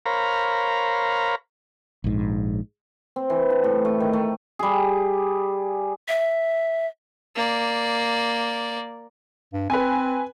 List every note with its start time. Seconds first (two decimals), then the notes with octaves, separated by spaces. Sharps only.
0.06 A#4 C5 C#5 F5 A#5 B5
2.04 A#1 G#2
3.16 C4
3.30 E3
3.50 A5
3.64 A2
3.85 A3
4.00 D#3
4.13 A3
4.59 G3 G#4
6.08 E5
7.35 A#3 D5
9.53 G2
9.70 C4 B4 G#5